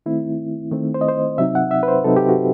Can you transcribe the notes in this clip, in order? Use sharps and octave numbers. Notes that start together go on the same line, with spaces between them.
D#3 A3 C4 E4
D#3 A3 C4
C5
D#5
C5
C3 F#3 C4 D#4 E5
F#5
E5
B4
C5
C3 F#3 C4 D#4 A4
G4
F#4